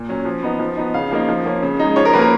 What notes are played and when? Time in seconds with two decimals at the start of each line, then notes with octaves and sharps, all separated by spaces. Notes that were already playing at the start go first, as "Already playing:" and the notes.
Already playing: A#2
0.09 F#3 C#4
0.25 F3
0.43 B3 D#4
0.60 F3
0.77 B3 D#4
0.94 C#3 F5
1.11 F3 A#3 D#4
1.29 F3
1.45 A#3 C#4
1.62 C#3
1.79 G#3 D#4
1.96 F3 C#5
2.05 A#4
2.13 A#3 C#4 B4
2.22 A#4